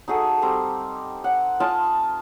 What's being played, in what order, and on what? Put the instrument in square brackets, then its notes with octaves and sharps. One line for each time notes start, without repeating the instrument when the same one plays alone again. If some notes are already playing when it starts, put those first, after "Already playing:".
[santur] D#4 F#4 G#4 A4
G3 C4 A#5
F#5
F4 D#5 G#5 A5